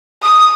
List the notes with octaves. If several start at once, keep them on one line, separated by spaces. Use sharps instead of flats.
D#6